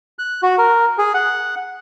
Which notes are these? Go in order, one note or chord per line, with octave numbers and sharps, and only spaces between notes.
F#6
F#4
A#4
G#4
F#5